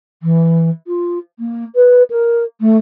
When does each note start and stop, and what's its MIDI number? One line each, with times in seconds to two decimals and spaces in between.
0.22 0.70 52
0.87 1.18 65
1.39 1.64 58
1.75 2.03 71
2.10 2.43 70
2.61 2.77 57